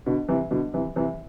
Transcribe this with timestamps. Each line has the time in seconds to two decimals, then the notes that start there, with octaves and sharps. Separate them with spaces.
0.06 B2 D3
0.28 C3 E3
0.51 B2 D3
0.74 C3 E3
0.96 C3 E3